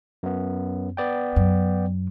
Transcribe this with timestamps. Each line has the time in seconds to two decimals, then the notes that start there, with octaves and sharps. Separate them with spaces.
0.23 F#2 B3
0.97 B3 D5 G5
1.36 F#2